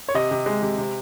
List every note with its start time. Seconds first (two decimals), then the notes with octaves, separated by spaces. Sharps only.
0.09 C#5
0.14 C3 D#5
0.31 C3
0.46 G#3
0.62 C3
0.78 C3